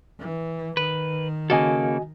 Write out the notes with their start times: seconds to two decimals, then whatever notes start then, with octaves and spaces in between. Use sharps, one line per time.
0.20 E3
0.77 D#3 B4
1.50 C#3 A#3 F#4 A4 D#5 G#5